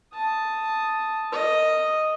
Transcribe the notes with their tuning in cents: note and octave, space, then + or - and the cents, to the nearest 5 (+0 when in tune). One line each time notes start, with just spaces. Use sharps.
A5 +0 D#6 +0
A#4 -35 D#5 +0